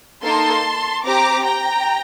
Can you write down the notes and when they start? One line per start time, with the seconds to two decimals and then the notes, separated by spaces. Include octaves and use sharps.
0.23 A#3 D#4 A4 A5 C6
1.05 C4 G4 A#5 D6
1.45 G5 A#5